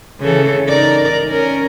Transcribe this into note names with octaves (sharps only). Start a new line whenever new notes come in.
C#3 E3 A4
D#4 A#4 D5
C#4 A#4